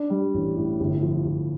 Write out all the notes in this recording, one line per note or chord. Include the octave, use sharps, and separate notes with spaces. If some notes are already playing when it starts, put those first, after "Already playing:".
Already playing: D4
G3
A1
A2
G1
F3
G1